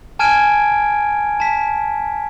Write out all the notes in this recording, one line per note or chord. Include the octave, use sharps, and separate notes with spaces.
G#5 A5 F6 G#6 D7 D#7
A5 B6